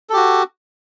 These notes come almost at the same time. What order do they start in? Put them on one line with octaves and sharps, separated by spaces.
A4 G4 F#4